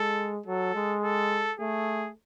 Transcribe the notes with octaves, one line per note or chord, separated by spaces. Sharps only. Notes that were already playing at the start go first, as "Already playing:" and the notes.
Already playing: G#3 A4
F#3 A4
G#3
A4
A3 G#4